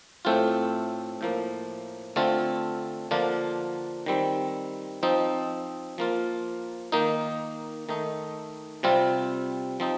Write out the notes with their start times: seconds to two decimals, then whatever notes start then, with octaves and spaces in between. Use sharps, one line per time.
0.25 A2 A3 C4 F4
1.21 A2 F3 A#3
2.16 D3 A3 C4 F4
3.11 D3 F3 A#3 D4 F4
4.06 D#3 G3 C4
5.03 F3 C4 D#4
5.98 F3 A#3 F4
6.92 D#3 A#3 D#4
7.89 D#3 A3 D#4
8.83 C3 G3 C4 F4
9.80 F3 C4 D#4